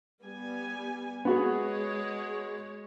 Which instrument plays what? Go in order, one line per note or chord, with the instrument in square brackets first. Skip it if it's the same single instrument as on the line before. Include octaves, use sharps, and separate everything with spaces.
[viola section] G3 B3 G#5
[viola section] G#3 C#5 [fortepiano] B3 F#4 G#4